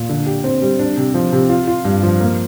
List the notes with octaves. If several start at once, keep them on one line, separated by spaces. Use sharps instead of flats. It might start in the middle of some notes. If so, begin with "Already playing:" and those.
Already playing: A#2
D3
G4
C4
G3
D4
C3
F3
C3
F4
F4
G2
F3
A#3